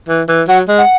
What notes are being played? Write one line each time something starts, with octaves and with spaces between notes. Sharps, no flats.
E3
E3
F#3 F#5
G#3
F#5